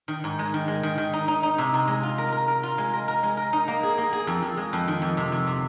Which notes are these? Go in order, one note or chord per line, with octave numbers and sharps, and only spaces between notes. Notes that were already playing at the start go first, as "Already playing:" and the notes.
D#3
G#2
G#3
D#3
G#3
D#3
D#3
D#4
D#4
D#4
C3
C3
G#3
F4
A#4
A#4
A#4
F4
G#3
A#4
A#4
G#3
A#4
D#4
A#3
G#4
A#3
G#4
F2
F2
G#3
F2
D#3
F2
C3
F2
C3